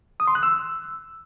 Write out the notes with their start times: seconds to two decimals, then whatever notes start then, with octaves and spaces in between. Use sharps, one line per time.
0.20 D#6
0.27 C6
0.35 F#6
0.43 E6